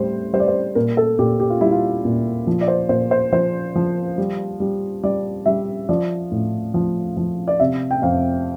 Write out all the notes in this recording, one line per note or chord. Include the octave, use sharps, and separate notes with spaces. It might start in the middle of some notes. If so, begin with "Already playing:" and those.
Already playing: A2 G3 C5
G3 C5
D5
C5
A#2 A#4
A4
A#2 G4
G4
F4
G3 E4
F4
A#2
F3
D5
C5
A#2 C5
C5
F3 C5
F3
G3
G3
G3 D5
G3 E5
F3 D5
A2
F3
F3
D5
C3 E5
G5
F2 F5